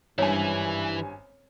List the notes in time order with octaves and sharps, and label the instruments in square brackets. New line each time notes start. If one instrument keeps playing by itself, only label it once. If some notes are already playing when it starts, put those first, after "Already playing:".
[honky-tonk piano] G#1 C#4 G#5 [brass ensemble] G2 [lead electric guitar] E3 E4 [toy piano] C#5